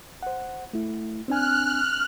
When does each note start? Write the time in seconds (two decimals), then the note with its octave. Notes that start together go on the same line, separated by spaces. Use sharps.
0.23 C5 F#5
0.73 A3 E4
1.28 C4 D4 G#5 F6 F#6